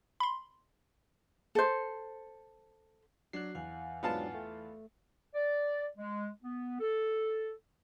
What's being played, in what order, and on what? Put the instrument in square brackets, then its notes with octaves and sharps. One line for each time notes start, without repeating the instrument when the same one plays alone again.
[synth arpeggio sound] B5 C6
[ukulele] A4 C5
[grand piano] F#3 D4 [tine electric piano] F#6 C7
[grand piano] E2 [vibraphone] F5 F#5 G#5
[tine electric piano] G#2 F#3 D4 [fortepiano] B3 F4 A5
[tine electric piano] A3
[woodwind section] D5
G#3
B3
A4